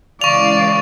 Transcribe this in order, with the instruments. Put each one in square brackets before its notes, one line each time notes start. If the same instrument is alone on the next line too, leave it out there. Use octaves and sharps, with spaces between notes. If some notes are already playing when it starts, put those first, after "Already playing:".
[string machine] C#3 E3 G#3 [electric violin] D5 [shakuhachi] F5 [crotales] C#6 F7